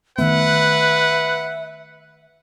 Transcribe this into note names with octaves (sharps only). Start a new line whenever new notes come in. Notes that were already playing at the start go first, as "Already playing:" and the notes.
D#3 A3 B3 B4 E5 F#5